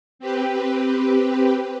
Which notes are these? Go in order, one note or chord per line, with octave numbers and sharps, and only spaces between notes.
C4 G4 B4